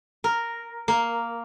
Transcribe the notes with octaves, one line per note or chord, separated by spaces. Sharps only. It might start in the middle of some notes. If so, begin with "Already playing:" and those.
A#4
A#3